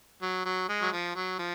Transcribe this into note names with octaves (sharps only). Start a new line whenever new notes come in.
F#3
F#3
G#3
F#3
F3
F#3
F3